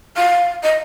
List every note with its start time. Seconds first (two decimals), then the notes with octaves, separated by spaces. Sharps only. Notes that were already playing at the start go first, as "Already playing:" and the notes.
0.17 F5
0.64 D#5